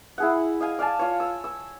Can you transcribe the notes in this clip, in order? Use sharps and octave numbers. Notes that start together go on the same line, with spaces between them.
E4 G#4 F#5
D#5 F5 G#5
D5 F5 G#5 A5
F4 C#5
E6
E6